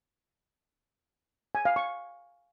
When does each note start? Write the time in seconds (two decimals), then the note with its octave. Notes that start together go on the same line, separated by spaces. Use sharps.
1.55 G#5
1.65 F5
1.76 C#6